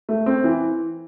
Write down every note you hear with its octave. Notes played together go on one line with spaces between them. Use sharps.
A3
C4
E3